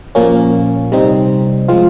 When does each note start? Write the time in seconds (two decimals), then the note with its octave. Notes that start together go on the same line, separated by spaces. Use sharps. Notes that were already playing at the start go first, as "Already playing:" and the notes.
0.15 A#2 F3 A#3 C#4
0.92 C3 G3 C4 D#4
1.68 F3 G#3 C4 F4